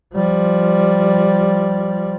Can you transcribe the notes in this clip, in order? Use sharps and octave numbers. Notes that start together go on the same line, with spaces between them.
F3 G3